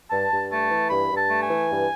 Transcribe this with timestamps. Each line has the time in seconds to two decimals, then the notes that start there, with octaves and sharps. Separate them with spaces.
0.11 G2 A5
0.30 G2
0.50 A3 A5
0.71 E3
0.90 G2 B5
1.10 G2
1.17 A5
1.29 A3
1.43 G#5
1.50 E3
1.69 G2